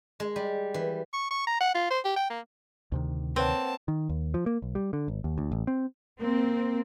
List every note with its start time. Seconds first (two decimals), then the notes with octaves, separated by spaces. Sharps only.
0.20 G#3
0.36 G3
0.74 E3
1.13 C#6
1.31 C#6
1.47 A#5
1.61 F#5
1.74 F4
1.91 C5
2.04 G4
2.16 G5
2.30 A#3
2.92 D2 C3 D#3
3.36 A#3 C4 B4 C#5 F#5 A5
3.88 D#3
4.09 D#2
4.34 F3
4.46 A#3
4.62 B1
4.75 G3
4.93 D3
5.08 G#1
5.24 D#2
5.38 D2
5.52 A1
5.67 C4
6.19 A#3 C4